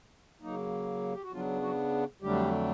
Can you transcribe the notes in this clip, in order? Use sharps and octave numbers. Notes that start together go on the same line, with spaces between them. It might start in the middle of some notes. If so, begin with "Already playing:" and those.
C#3 F#3 A#3 D#4
G4
F#4
C#3 F3 F#3 B3 D4 F4
F#3 F#4
F2 D3 F#3 G3 A3 D4 G4